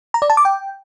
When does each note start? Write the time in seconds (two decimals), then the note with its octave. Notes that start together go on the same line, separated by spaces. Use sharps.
0.14 A#5
0.22 D5
0.30 A5
0.37 D6
0.45 G5